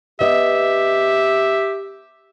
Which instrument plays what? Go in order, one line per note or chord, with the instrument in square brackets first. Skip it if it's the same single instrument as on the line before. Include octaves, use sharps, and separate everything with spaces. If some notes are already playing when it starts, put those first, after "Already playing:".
[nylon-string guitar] B3 D#5 [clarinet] G4 [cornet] E5